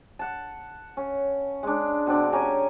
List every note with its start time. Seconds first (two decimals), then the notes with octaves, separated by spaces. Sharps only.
0.19 F#5 A5
0.97 C#4
1.63 G#3 D4
2.07 B2 C4 D4
2.33 C#4 G4 G#5 A#5